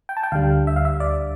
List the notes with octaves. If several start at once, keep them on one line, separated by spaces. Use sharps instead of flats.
G5
A5
G5
D2 D3 G3 F5
E5
F5
E5
D5